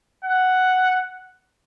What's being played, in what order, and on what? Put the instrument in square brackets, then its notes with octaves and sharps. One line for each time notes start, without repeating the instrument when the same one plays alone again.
[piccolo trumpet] F#5